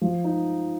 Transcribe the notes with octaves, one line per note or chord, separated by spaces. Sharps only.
F3
D#4